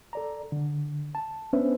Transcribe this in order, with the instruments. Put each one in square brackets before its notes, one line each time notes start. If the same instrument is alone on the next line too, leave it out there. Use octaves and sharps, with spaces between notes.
[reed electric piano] A4 D5 A#5
D3
A5
B3 C#4 D4 B4 C5 E5